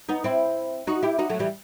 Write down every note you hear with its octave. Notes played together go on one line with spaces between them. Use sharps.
B3 D#4
C4 E4
D#4 F#4
E4 G4
D#4 F#4
F#3 A3
E3 G3